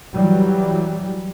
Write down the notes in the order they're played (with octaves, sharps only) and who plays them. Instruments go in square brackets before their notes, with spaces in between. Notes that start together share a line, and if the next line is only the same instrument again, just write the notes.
[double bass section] E3 F#3 G3